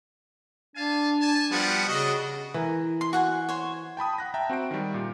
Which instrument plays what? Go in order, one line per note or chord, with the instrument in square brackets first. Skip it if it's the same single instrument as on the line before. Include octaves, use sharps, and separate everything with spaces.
[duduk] D4 [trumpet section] F5 G#5 A5
[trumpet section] G#5 A5
[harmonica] F3 G3 B3 [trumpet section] F#4 F#5
[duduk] C#3 [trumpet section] D4 [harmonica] F#4 D#5
[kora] E3 A#4
[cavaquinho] C6
F#4 F#5 G#5
C5 C#5
[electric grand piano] G5 A5 B5 D#6
F#5 F#6 A#6
E5 G5 A5 A#5
C4 F#4 C5 D7
D#3 G3
A#2